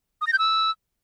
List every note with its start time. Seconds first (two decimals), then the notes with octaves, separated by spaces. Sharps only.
0.21 D#6
0.27 A#6
0.33 G6
0.39 E6